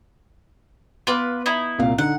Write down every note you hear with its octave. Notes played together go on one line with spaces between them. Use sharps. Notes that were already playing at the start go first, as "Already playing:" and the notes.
B3 F4 B4 D6
D#4 E4
C2 A#2 F5
D3 D#4 F#5